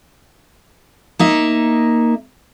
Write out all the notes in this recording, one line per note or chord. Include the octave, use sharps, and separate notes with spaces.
A#3 D#4 E5